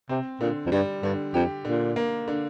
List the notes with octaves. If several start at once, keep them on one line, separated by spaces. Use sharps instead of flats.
C3 C4
A#2 D3
F2
G2 G3
G2 D3
F2 G4
A#2 D3
A#3
D3